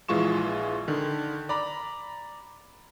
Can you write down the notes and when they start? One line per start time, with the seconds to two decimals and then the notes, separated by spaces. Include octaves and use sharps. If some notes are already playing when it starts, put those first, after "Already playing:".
0.09 A#1 E3 G#3 F4 C#6 E7
0.88 D3 D#3
1.49 D5 A#5 B5